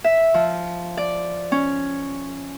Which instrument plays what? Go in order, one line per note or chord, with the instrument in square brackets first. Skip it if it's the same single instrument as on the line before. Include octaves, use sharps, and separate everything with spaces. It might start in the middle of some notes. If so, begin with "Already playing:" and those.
[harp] E5
F3
D5
C#4